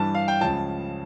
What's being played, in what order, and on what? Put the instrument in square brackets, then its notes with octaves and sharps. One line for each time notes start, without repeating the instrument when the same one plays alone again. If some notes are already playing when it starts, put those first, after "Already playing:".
Already playing: [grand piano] G2 E3 G3 D4 A5
F5
G5
C#2 C#3 F3 A5